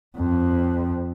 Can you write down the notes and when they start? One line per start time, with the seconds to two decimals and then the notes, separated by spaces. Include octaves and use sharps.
0.18 F2